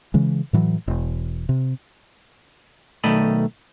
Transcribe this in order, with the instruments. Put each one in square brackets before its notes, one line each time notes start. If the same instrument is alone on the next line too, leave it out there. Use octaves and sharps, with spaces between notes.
[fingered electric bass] C#3 E3 G#3
A2 E3 F#3
E1
C3
[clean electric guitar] B1 D#3 A3 D5 D#5 B5